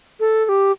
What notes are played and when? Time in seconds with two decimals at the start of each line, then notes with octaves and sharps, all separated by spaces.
0.20 A4
0.45 A4
0.49 G4